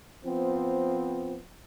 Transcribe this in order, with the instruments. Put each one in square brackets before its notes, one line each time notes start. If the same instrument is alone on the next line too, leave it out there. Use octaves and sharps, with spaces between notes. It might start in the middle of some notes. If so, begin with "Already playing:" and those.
[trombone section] F3 B3 C4